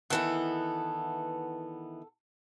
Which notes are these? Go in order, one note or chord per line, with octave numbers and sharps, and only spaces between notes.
D#3 E3 B3 A4 F#5